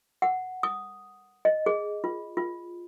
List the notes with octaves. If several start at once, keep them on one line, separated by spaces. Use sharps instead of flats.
F#5
D#6
D#5
G#4
F4
F4